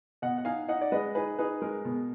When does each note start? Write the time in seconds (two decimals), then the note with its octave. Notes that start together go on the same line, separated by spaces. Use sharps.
0.22 B2 D#5 F#5
0.38 F#5
0.45 D#4 F5 G#5
0.68 D#4 D#5 F#5
0.81 D5
0.92 G#3 B4 D#5
1.15 D#4 G#4 B4
1.39 D#4 G#4 B4
1.62 G#3 A#4
1.85 B2